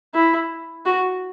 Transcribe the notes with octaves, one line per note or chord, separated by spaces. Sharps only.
E4
F#4